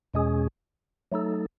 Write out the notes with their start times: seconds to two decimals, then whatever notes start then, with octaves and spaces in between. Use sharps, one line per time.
0.14 E2 B2 G#3 C#4 G#4
1.12 F#3 A3 D#4 A4